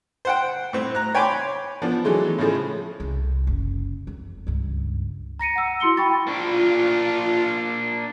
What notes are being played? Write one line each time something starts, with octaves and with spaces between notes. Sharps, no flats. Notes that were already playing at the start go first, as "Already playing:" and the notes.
C5 F#5 G5
A2 C4
A#5 F#6
C#5 G5 G#5 B5 C6 D6
F3 B3 D4
E3 F#3 G#3 A3
A2 C#3 F3 G#3
C2
F#1
F2
C#2 G2
A#5 A#6 C#7 D#7
F#5 E6
E4 F#4 C6 C#7 G7
G5 B5 C#6 A6
A#3 D4 F4